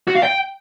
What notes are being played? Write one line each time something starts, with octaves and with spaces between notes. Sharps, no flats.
F#4
F5
G5